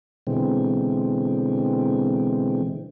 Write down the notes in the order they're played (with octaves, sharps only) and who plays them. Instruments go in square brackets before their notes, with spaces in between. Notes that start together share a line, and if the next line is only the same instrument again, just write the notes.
[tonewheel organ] B2 D3 E3 G#3 C4